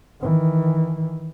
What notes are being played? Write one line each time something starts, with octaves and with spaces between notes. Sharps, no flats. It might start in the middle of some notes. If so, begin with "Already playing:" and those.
D#3 E3